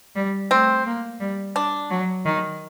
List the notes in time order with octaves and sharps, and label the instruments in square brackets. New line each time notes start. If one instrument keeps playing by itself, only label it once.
[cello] G3
[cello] A3 [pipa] C4
[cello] A#3
G3
[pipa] D4
[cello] F#3
D#3